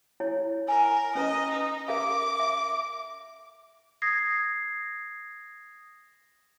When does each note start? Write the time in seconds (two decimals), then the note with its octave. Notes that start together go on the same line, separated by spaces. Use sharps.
0.20 E4 C#5
0.68 A#4 G#5
1.15 C#4 B4 D#5 A#5
1.51 D#4
1.88 A#4 E5 F5 D6
2.40 E5
4.02 D#6 G#6 A#6 C7